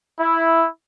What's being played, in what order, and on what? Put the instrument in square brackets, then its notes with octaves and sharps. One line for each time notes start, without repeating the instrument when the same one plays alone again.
[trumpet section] E4